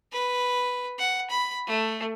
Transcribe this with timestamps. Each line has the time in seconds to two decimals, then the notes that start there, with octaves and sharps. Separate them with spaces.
0.13 B4
0.99 F#5
1.30 B5
1.67 A3